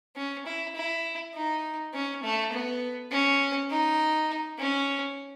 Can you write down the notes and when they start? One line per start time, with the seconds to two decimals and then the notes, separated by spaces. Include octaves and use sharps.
0.16 C#4
0.46 E4
0.75 E4
1.34 D#4
1.94 C#4
2.23 A3
2.52 B3
3.11 C#4
3.70 D#4
4.58 C#4